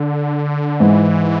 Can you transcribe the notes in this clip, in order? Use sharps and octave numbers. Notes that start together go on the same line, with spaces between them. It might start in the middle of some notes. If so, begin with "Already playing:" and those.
Already playing: D3
G#2 E3